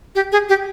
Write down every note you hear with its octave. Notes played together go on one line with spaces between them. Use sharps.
G4
G#4
G4